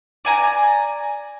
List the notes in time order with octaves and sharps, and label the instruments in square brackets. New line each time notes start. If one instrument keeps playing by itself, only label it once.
[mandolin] D5 G#5 A#5